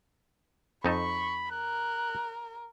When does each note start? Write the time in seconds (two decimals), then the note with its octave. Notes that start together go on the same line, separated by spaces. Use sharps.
0.85 F2 D#4 A4 B5 C#6
1.51 A#4 F#6